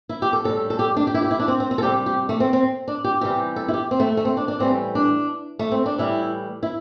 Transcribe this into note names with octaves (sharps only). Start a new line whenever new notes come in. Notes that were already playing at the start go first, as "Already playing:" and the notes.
E4
G4
A4
A2 G3 A4
A4
G4
D4
G4
E4
G4
E4
D4
C4
C4
C4
A4
C3 G3 G4
G4
A3
C4
C4
D4
G4
C3 E3 G3 G4
A4
E4
G4
C4
A3
A3
C4
D4
D4
A2 E3 G3 C4
D4
A3
C4
D4
A2 E3 G3 E4
E4